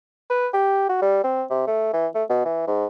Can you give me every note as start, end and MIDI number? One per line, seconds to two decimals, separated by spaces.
0.30 0.47 71
0.54 0.87 67
0.89 0.98 66
1.02 1.22 55
1.24 1.44 60
1.50 1.64 48
1.67 1.93 57
1.93 2.07 52
2.15 2.24 57
2.30 2.44 47
2.45 2.65 52
2.67 2.86 44